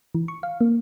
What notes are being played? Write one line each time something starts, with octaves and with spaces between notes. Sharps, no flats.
E3
C#6
F5
A#3